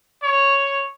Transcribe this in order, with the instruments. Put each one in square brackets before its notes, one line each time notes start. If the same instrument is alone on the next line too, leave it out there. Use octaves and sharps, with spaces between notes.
[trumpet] C#5